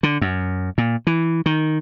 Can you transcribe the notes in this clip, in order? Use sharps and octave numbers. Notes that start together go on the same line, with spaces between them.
D3
F#2
A#2
E3
D#3